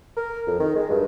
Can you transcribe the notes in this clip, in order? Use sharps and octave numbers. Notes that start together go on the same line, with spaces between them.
A#4
F2
D#3
G#3
G2